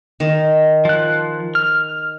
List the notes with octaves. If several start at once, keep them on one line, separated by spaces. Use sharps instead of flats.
D#3
F3 F#6
F6